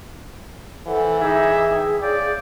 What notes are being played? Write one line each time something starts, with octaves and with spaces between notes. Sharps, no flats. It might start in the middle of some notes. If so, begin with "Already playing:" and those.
E3 A4 C5 F#5
D#4 G#4 E5 D6 G#6
G5
C#5 D5 F5 G6